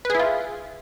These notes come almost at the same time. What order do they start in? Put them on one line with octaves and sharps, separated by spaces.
B4 G#4 E4 F4